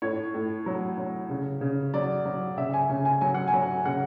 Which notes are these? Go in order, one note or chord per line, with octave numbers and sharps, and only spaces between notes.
A2 C#5
A2
F#3
F#3
C#3
C#3
F#3 D5
F#3
C#3 E5
G#5
C#3
G#5
F#3 G#5
F#5
G#5
F#3
C#3 F#5